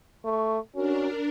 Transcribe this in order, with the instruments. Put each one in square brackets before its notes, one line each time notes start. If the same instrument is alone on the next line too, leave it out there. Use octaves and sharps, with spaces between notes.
[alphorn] A3 [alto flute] C#6
[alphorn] C#4 [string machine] D4 A#4 [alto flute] F#4